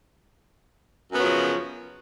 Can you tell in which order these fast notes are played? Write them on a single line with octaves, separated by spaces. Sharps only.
F#2 B3 F#3 F3 C#3